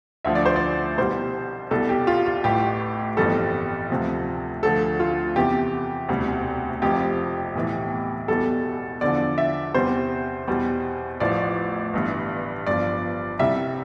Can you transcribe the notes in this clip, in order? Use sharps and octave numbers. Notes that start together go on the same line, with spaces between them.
D2 D3 F3 E5
D5
C5
D5
C2 B2 G3 C5
C2 B2 G3 A4
G4
F4
F4
A1 A2 G3 G4
G1 F2 E3 G3 A4
D2 C3 F3
D2 D3 F3 A4
F4
E2 C3 E3 G4
E1 D2 C3 G3
F1 F2 C3 F3 G4
B1 A2 E3
E1 E2 B2 G3 A4
E2 D3 F3 D5
E5
E2 C3 G3 C5
E2 B2 G3
A1 A2 F3 D5
G1 G2 E3
G1 G2 F3 D5
C2 C3 G3 E5